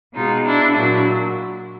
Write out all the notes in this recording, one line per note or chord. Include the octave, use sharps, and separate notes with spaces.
B2 G#3 D#4 F4
D4 E4
A#2 F#3 D4 E4